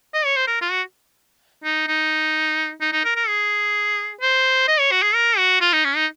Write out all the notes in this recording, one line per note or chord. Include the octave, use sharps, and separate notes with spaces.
D#5
C#5
C5
A#4
F4
F#4
D#4
D#4
D#4
D#4
A#4
A#4
G#4
C5
D#5
C#5
F#4
G#4
A#4
F#4
F4
D#4
C#4
D#4